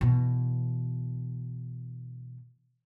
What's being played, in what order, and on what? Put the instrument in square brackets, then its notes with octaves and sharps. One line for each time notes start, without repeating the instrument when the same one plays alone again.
[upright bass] B2 E3